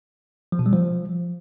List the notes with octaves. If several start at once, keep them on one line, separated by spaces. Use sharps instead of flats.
F3
B2
G3
F3